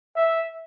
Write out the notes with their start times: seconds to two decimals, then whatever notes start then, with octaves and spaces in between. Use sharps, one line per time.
0.16 E5